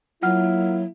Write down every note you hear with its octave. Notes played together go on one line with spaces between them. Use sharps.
F#3 A#3 E4 F4 F#5 F6